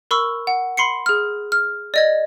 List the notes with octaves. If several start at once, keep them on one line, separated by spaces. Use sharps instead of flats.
A#4 B5 C#6 E6
F#5
B5 C6 C7 C#7
G#4 F6
F6
D5 D#5 G#6